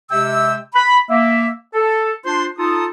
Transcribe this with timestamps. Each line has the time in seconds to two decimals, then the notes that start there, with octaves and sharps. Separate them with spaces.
0.11 C3 G#3 G4 E5 G5 E6
0.75 B5
1.10 A#3 E5
1.74 A4
2.26 D4 F4 C5 C6
2.58 D#4 F4 A4 D#6